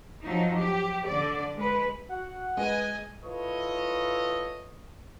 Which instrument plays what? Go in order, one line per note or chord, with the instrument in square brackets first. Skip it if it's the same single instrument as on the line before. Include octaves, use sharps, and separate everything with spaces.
[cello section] F3 F#3 D#4
G4
D3 D5
G#3 B4
[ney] F#4 [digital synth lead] F#5
[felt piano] G#3 [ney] B4 [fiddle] D#5 G#5
[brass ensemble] E4 F4 A4 B4 C#5 D#5